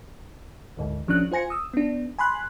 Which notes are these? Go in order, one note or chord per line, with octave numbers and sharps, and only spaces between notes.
G#1 D2 G#2
A1 F3 C#4 D4 F#6
F4 C5 G#5 A#6 C#7
D#6 E6
B3 D4
G#5 B5 C6 F#6